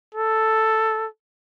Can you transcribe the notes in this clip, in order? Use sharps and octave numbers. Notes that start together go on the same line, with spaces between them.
A4